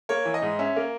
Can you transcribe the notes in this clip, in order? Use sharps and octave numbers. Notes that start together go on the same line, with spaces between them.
A#3 C#5
E3
D#5
G#2
C#4 E5
A#3